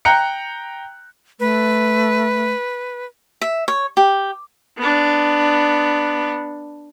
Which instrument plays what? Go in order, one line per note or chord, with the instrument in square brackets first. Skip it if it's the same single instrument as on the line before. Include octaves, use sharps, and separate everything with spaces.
[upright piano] G5 A#5 F#6 C#7
[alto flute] A3 [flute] B4
[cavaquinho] E5
C#5
G4
[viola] B3 D4